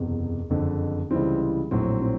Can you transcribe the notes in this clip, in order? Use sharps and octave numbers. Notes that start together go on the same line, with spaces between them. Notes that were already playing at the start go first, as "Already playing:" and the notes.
Already playing: F#1 E2 C3
F#1 F2 D3
C#2 C3 E3 G3 C4
A#1 A2 F#3 C4
C4